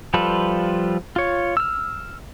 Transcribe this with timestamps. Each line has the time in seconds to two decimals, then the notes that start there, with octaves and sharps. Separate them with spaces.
0.14 F3 G3 F4 A4 B4
1.16 F4 C#5
1.57 E6 F6